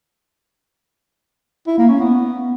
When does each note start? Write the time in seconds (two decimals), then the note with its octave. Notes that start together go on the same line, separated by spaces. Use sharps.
1.67 E4
1.78 A#3
1.89 C#4
2.00 B3